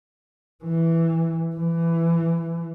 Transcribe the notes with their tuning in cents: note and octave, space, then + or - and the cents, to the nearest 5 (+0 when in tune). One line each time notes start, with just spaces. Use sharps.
E3 +0
E3 +15